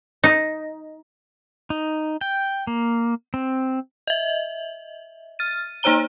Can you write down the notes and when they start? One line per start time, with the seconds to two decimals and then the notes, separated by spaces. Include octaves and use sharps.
0.24 D#4
1.70 D#4
2.21 G5
2.67 A#3
3.34 C4
4.07 D#5 E5
5.39 F6 A6 D#7
5.83 A#3 D#4 C5 C#5 A#5 G7